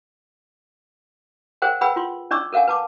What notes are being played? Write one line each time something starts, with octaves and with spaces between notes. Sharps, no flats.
G#4 A#4 C5 F#5 G5
G#4 B4 F#5 G5 B5 E6
F4 C6
C#4 D4 D5 C#6 D6 E6
A4 A#4 F5 F#5 G#5
B4 A5 D6